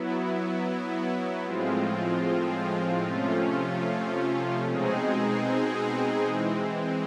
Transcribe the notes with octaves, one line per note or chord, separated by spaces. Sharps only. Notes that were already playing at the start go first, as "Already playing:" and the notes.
Already playing: F#3 B3 E4
A2 F3 G#3 C4 F4
C3 F3 A3 C#4 F4
B2 G#3 C4 D#4 G#4
E3 G#3 C4